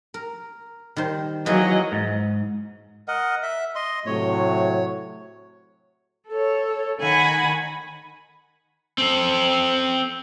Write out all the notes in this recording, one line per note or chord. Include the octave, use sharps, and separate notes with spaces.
A#4
D#3 G3 C5
E3 F#3 A#3 G#4 D#5
G#2
A#4 D#5 F#5
E5
D#5 C6
A2 C3 F#3 C#5
A4 C#5
D#3 F#5 G#5 B5
C4 A4